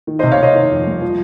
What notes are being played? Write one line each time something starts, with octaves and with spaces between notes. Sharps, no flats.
D#3
C5 D#5
C3
C#5 F5
C3 C5 D#5
D#3
F2
G3
F3